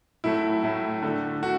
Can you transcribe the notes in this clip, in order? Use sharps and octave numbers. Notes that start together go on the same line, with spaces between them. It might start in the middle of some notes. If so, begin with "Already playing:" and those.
A2 F#3 A3 E4
A2 F#3 A3
D3 A3
D3 F#4